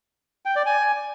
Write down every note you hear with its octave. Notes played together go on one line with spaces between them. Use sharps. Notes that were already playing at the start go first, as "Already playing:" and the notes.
G5
D5
G#5